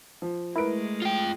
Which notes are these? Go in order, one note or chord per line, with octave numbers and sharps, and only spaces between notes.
F3
G#3 A3 E4 A#4 B4 D7
F4 G5